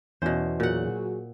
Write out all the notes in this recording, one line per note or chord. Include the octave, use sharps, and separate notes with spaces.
E2 B2 C#4 C5
A#2 F#3 F#4 G#4 F#5